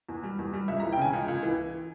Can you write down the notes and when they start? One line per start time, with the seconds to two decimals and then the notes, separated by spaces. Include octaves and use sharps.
0.09 E2
0.23 G3
0.39 E2
0.53 G3
0.68 C#2 E5
0.80 E3 A#5
0.92 G5
0.98 C#3 G#5
1.13 C#2
1.28 C#2
1.43 E3